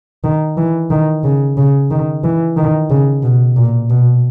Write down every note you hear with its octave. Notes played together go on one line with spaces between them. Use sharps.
D#3
E3
D#3
C#3
C#3
D#3
E3
D#3
C#3
B2
A#2
B2